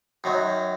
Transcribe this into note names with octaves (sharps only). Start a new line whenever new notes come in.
F#2 D#3 F#3